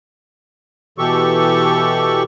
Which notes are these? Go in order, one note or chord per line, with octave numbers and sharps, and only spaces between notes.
B2 E3 G4 A4 C#6